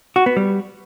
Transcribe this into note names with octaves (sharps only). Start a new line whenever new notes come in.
F#4
B3
G3